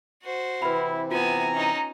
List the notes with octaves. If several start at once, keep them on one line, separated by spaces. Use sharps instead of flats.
F#4 C5
C3 E3 C4 E4 B4 B5
B3 F4 G#5 A#5
C#4 D#4